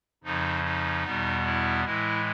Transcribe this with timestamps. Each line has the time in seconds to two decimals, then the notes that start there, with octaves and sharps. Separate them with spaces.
0.24 F2 C#3 F3 D#4
0.64 D#4
1.04 E2 B2 G3 B3
1.45 E4
1.84 A2 E3 G#3 E4